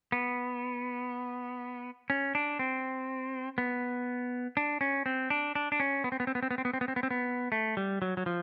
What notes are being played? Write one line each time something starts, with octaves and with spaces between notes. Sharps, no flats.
B3
C#4
D4
C4
B3
D4
C#4
C4
D4
D4
D4
C#4
B3
C4
B3
C4
B3
C4
B3
C4
B3
C4
B3
C4
B3
C4
B3
A3
G3
F#3
F#3
F3